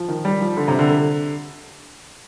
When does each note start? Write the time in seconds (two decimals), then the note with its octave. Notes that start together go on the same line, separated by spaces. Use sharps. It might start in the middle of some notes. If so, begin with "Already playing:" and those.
Already playing: F3
0.08 D#3
0.25 G3
0.41 F3
0.57 D3
0.68 C3
0.79 D3